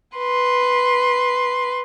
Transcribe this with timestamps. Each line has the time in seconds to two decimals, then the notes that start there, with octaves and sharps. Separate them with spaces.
0.16 B4 C6